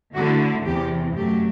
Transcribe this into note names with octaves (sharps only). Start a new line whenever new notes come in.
D3 A3 E4 F#4
E2 C3 E3 G4
F#2 F#3 A3 G4